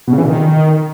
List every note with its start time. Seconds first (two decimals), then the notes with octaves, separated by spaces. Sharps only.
0.07 B2
0.13 C#3
0.18 E3
0.23 A#2
0.28 D#3